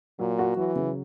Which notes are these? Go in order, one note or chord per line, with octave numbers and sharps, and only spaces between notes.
A#2 F#3
F#4
E3 F#3
C#3